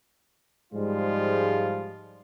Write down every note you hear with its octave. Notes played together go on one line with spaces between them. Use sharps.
G#2 F3 G3 G#3 F4